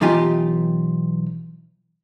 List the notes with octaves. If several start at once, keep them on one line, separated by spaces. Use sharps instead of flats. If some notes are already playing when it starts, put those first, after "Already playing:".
B1 E3 D#4 F4 G4 G#5